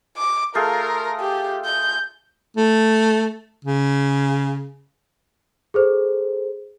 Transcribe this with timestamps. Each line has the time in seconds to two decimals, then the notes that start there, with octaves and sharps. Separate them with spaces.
0.17 D6
0.55 A3 F4 G#4 A#4
1.20 G4
1.65 G6
2.57 A3
3.65 C#3
5.74 G#4 A4 C5